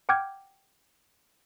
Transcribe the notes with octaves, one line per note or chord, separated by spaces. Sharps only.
F#5 G5 D6 F6 G6 G#6